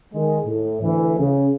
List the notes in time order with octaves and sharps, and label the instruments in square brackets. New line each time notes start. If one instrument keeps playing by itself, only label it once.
[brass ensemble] D#3 G#3
A2
D2 E3
C#3